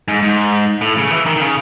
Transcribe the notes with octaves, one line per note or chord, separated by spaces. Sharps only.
G#2
G#2
A2
C#3
E3
D#3
D#3
C#3